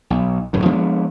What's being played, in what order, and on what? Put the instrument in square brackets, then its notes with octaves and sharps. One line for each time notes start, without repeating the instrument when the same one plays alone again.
[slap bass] B1
D1 F#2 A2
F3 G#3 B3 D4